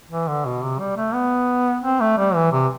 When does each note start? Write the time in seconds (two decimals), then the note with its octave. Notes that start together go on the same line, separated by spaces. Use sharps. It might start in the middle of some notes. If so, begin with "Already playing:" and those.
0.11 E3
0.28 D3
0.46 B2
0.63 C3
0.80 G3
0.96 A3
1.14 B3
1.84 C4
2.00 A3
2.18 G3
2.35 E3
2.52 C3